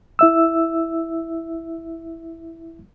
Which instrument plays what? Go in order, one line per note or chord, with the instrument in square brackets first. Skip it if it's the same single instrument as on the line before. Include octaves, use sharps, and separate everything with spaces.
[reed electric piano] E4 E5 E6